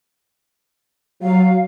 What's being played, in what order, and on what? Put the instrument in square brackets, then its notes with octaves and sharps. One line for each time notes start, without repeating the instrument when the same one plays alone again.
[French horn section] F#3 [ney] F5